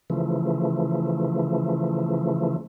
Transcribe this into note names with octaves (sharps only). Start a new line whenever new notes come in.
C#3 E3 F3 A3